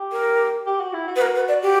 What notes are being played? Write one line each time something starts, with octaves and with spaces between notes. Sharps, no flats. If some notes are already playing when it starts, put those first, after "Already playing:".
Already playing: G4
A#4
G4
F#4
E4
F#4
B4
A#4
B4
D5
G4